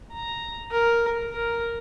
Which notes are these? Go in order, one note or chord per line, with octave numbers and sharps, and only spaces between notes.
A#5
A#4
A#4